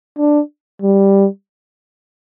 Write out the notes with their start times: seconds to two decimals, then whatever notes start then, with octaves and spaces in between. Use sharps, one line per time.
0.18 D4
0.82 G3